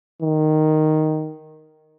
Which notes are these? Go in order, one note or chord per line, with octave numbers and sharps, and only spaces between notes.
D#3